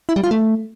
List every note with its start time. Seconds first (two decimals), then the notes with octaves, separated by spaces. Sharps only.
0.09 E4
0.16 G3
0.24 F4
0.31 A3